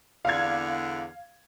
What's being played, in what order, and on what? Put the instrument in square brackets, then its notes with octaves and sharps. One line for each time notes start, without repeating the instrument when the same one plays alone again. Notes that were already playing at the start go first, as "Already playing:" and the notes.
[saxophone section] E2 D3 [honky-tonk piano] F5 G#6